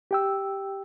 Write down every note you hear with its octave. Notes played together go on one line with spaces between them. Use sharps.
G4 G5 E6